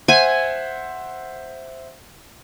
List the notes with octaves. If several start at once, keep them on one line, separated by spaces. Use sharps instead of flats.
C5 E5 F#5 G#5